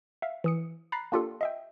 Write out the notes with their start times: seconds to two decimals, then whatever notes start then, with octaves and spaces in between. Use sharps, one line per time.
0.22 E5 F5
0.44 E3 D#6 C#7
0.92 A#5 B5 F#6 A6 B6 C7
1.12 A#3 D4 F4 G4 A4
1.41 D#5 E5 G5